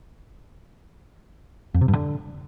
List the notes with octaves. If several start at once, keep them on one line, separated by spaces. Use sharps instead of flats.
F2
C3
G2
D3